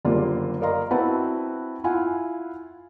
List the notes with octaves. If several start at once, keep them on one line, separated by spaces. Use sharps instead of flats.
F#1 D3 G3 A#3 F4 D5
A#4 D5 D#5 F5 A#5 C6
C4 E4 F#4 B4 F#5 A5
E4 F4 F5 F#5 G#5